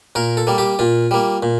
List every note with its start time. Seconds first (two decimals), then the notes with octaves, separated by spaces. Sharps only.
0.15 A#2 A#4
0.37 A4
0.47 G3 A#3
0.58 G4
0.79 A#2 F4
1.11 G3 A#3
1.43 A#2